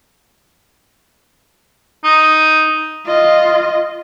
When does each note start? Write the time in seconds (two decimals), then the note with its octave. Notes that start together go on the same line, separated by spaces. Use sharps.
2.04 D#4
3.07 F4 D#5